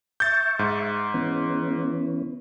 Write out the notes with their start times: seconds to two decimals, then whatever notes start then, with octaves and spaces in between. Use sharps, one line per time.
0.20 E5 C#6 G6 A6
0.59 G#2
1.14 E3 B3 C#4